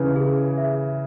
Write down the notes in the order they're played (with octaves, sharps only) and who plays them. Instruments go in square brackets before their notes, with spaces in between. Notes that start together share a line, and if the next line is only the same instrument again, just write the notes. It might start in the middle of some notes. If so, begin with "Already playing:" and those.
Already playing: [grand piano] C#3 E3 [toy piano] B4
[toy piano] G#4
E5